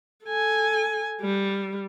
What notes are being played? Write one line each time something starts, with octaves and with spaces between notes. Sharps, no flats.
A4 G#5
G3